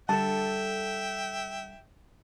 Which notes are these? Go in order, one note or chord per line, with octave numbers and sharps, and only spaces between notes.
D3 G3 A4 E5 G5 A5